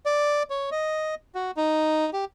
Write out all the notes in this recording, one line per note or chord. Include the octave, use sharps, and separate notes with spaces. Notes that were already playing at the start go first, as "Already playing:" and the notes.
D5
C#5
D#5
F#4
D#4
G4